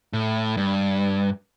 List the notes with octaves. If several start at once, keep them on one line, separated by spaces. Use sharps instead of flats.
A2
G2